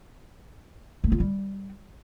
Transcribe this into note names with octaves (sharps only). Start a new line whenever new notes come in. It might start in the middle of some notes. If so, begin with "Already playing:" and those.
A3
F4
G3